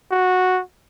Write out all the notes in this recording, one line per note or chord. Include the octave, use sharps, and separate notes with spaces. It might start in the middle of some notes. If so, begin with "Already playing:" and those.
F#4